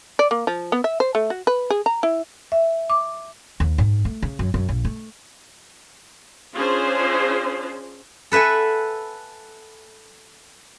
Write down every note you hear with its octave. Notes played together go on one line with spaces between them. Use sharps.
D5
A#3
F3
B3
E5
C5
A3
F#4
B4
G#4
A#5
E4
E5
D6
D#2
G#2
A3
C#3
F#2
F#2
A#1
A3
C#4 D4 F4 G#4 C5
A4 B4 E5 F#5 G#5